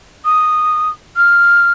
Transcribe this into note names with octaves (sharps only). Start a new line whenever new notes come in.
D#6
F6